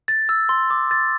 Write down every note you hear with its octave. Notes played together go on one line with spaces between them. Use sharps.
A6
E6
C6
D6
A6